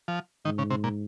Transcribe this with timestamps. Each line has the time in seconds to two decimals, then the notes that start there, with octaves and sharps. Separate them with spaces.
0.08 F3
0.45 G#2 D#3
0.58 C#3
0.70 C3
0.84 A#2